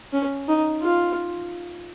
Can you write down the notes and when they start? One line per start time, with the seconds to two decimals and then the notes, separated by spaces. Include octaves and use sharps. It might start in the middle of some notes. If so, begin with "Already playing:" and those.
0.13 C#4
0.48 D#4
0.82 F4